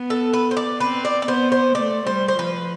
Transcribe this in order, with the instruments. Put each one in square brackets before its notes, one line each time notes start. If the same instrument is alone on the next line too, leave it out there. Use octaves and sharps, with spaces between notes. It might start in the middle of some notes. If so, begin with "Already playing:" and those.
Already playing: [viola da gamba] B3
[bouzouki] A4
B4
C5
D5
[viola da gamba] C4 [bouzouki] B4
[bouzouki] D5
D5
[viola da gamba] B3 [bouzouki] C5
[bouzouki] C5
[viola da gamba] A3 [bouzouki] D5
[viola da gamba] G3 [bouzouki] C5
[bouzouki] C5
[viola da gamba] F3 [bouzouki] B4